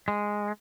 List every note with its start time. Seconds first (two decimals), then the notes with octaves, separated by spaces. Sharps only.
0.08 G#3